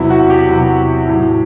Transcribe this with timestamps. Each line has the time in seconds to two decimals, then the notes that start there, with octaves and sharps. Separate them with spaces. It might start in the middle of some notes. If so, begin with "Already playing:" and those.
Already playing: E2 C3 F#3 E4
0.10 F#4
0.30 G4
0.50 E2 C3 F#3
1.08 A2 F#3